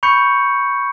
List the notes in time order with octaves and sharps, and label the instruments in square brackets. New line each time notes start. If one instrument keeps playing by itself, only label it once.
[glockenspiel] B5 C#6 G6 C#7